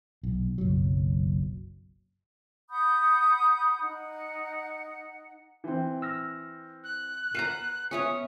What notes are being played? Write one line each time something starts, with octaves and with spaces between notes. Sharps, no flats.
B1
F#1 B1 F#3
F#5 B5 D#6 G6
D#4 F#5
E3 C4
E6 F6 A#6
F#6
B4 F#5 A#5 F6 C7 E7
B3 C#4 B4 C#5 E5 D#6 C#7